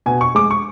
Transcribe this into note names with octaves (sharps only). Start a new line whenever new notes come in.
B2 G#5
C#6
G#3 D6
C#6